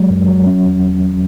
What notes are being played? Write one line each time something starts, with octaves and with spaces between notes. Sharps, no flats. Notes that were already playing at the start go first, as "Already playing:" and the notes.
Already playing: F#3 G#3
F#2
F#3
C#4
E2
E2